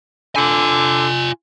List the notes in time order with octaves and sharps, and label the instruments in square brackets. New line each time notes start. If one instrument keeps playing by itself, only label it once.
[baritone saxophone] D3 [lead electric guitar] F4 G#5